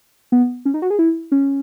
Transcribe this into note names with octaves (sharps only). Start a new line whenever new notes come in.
B3
C#4
D#4
F#4
G#4
E4
C#4